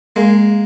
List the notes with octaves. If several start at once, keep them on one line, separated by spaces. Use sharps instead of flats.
G#3 A#3